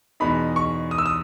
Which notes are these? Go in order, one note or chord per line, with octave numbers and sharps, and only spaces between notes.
E2 B2 G#3 D#4 B5
C#6
D#6
E6
D#6